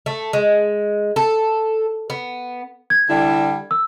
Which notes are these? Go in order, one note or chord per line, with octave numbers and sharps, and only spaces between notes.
A3
G#3
A4
B3
G#6
D3 G3 E4
E6